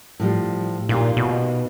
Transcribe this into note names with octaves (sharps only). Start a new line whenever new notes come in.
A2 F3 G3
A#2 D#4 F4 G4
B2